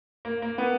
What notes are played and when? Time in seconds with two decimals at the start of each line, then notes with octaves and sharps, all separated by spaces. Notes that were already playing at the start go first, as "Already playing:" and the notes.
0.25 A#3
0.42 A#3
0.58 B3